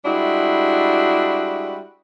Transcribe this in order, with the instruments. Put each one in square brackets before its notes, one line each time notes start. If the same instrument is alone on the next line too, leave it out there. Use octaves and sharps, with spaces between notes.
[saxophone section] G3 G#3 D4 E4 F#4